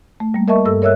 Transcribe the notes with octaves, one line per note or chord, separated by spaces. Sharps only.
A3
G3 A#3
A#4 D#5 E5 A5 C#6
G2 A4 E6
A#4 C#5 D#5 E5 E6 F#6